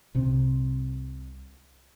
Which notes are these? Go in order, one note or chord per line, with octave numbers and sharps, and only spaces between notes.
C2 C3